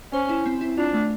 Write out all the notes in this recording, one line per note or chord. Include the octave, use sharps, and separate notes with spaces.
C#4 C5
E4
C4
E4
D4 F4
A3